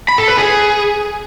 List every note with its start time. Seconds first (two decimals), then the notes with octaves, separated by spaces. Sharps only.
0.08 B5
0.18 A4
0.28 B4
0.38 G#4